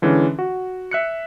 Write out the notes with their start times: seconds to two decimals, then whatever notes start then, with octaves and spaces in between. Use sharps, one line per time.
0.02 D3 E3 G#3 C#4 D4
0.39 F#4
0.91 E5 F#6 C#7